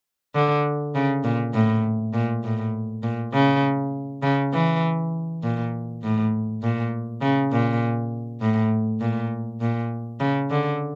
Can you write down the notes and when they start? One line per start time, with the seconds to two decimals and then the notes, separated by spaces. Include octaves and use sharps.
0.35 D3
0.95 C#3
1.24 A#2
1.54 A2
2.14 A#2
2.44 A2
3.03 A#2
3.33 C#3
4.23 C#3
4.54 E3
5.43 A#2
6.03 A2
6.62 A#2
7.22 C#3
7.52 A#2
8.41 A2
9.01 A#2
9.61 A#2
10.20 C#3
10.50 D3